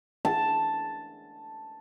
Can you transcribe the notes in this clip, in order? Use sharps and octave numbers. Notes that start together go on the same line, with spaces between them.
A5